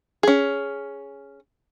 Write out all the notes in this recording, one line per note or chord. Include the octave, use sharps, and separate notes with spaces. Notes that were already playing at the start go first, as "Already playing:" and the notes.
C#4 G#4